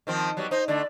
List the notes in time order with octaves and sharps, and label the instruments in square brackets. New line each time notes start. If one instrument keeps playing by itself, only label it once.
[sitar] D#3 F3 C4
F#3 G3 B3
[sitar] D#4 [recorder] C5
[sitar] D3 A3 [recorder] D5